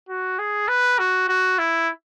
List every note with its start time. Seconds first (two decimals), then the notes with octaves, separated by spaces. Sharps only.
0.09 F#4
0.39 G#4
0.68 B4
0.99 F#4
1.28 F#4
1.59 E4